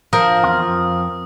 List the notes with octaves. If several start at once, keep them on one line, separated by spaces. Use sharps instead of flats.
F3 A#4 D#6
E2 C4 F4
F2